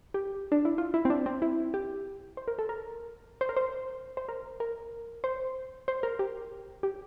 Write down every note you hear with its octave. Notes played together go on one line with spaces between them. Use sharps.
G4
D4
E4
F4
E4
C4
D4
C4
E4
G4
C5
A#4
A4
A#4
C5
A#4
C5
C5
A#4
A#4
C5
C5
A#4
G4
G4